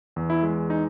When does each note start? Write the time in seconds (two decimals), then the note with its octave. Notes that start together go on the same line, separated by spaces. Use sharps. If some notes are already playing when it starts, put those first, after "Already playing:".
0.16 E2
0.30 E4
0.43 G#3
0.70 D#4